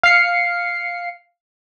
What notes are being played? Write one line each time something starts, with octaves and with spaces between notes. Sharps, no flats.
F5 C7 C#7